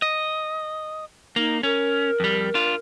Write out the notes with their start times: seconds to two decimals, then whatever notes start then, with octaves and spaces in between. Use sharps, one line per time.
0.02 D#5
1.36 A#3 D#4
1.63 C#4 A#4
2.20 F2 G3
2.54 D4 F4